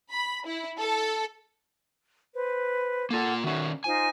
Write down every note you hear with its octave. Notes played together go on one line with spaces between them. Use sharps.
B5
E4
A4
B4 C5
A#3 F4 A4 F#5
D#3 C#4 F#4 E5
D#4 F4 C5 G#5